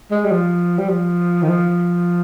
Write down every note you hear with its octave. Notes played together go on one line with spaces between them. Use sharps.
G#3
G3
F3
G3
F3
D#3
F3